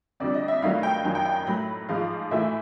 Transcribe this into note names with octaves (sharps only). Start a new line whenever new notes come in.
F2 D3 G3 D5
D#5
E5
G2 D#3 F#3 A3 F5
G5
F#2 D#3 F#3 G#5
G5
G5
B5
A2 F#3 A3 B5
G#2 F3 G#3 F5
A2 E3 A3 E5